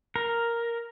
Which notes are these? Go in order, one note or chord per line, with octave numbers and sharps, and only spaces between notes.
A#4